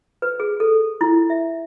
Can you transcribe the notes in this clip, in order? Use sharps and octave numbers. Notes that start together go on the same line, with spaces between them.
B4
G#4
A4
E4
E5